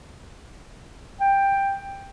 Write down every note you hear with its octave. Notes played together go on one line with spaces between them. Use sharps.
G5